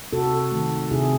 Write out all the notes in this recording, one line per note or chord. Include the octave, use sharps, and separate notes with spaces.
C3 F#4 A4
D#3 A3
C3 E4 G#4